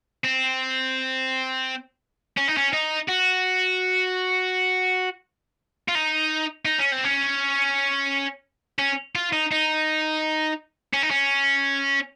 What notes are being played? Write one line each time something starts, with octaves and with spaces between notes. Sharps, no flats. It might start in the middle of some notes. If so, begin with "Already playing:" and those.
C4
C#4
D#4
C#4
D#4
F#4
F4
D#4
D#4
C#4
C4
C#4
C#4
F4
D#4
D#4
C#4
D#4
C#4